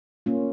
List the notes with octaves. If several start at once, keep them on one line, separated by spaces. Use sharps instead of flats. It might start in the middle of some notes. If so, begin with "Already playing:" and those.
A#3 C#4 F4